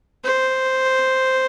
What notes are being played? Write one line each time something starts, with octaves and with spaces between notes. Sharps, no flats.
C5